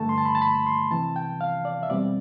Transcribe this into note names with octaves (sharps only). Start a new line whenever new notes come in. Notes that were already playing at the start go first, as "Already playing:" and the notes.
Already playing: G2 D3 A3 A5
C6
A5
B5
A5
B5
C6
C2 C3 E3 A5
G5
F5
D5
E5
E2 B2 G3 C4 D5